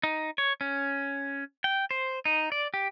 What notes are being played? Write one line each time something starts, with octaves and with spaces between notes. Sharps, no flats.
D#4
C#5
C#4
G5
C5
D#4
D5
G4